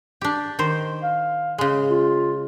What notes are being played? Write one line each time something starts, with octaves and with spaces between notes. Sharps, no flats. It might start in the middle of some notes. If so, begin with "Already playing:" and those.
D4 G4
D#3 C5
F5
C#3 G#3
F4